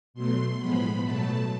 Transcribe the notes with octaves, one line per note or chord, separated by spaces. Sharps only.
B2 F#3 A3 C6
A2 F3 G#3 B3 B5
B2 F#3 A3 A5